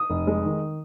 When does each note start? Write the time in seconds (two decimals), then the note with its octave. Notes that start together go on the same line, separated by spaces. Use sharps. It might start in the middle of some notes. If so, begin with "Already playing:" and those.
Already playing: D#6
0.10 F1
0.27 G#3
0.45 D#3